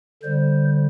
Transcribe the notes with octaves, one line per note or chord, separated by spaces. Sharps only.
D3 G3 C5